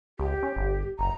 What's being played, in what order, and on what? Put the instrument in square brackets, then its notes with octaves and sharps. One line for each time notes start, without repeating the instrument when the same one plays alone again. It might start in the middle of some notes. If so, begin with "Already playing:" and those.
[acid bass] C#2 [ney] G4
[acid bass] C#4
G1
[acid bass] F#1 [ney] A#5